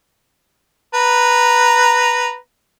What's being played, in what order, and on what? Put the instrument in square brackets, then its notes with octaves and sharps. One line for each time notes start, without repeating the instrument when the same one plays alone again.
[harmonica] B4 A#5